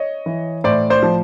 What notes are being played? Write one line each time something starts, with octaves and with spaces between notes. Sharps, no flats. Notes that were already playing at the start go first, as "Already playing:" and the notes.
Already playing: C#5 D#5
E3
A2 C5 D5
C5 D5
F3